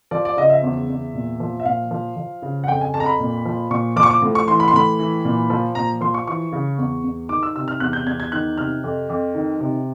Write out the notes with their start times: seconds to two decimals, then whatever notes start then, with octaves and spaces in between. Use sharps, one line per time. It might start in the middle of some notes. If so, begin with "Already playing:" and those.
0.11 F3 D5
0.25 D5
0.37 C#3 D#5
0.50 E5
0.63 E2
0.89 E2
1.14 A#2
1.40 F3
1.60 E5
1.65 A#2 F5
1.91 F3
2.17 F3
2.42 C#3
2.64 F#5
2.68 F2 G5
2.81 G#5
2.94 F2 A5
3.00 A#5
3.06 B5
3.20 A#2
3.45 F3
3.71 A#2 C#6
3.96 F3 D6
4.03 C#6
4.10 D6
4.22 A2
4.35 C#6
4.48 E3 C6
4.60 B5
4.68 C6
4.73 A2 B5
4.99 E3
5.25 A#2
5.50 F3
5.75 A#2 A#5
6.01 F3 C6
6.14 C#6
6.27 E3 C#6
6.52 C#3
6.78 E2
7.04 E2
7.29 D#3 D6
7.43 E6
7.56 C3 E6
7.68 F6
7.80 E2 F#6
7.93 G6
8.07 E2 G#6
8.20 G#6
8.32 D#3 F#6
8.58 C3 F6
8.84 F2
9.09 F2
9.35 D#3
9.60 C3